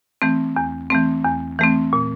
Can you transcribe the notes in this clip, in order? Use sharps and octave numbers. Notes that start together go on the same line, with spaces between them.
E3 A3 C4
E2
E3 A3 C4
E2
E3 A3 C4
A#2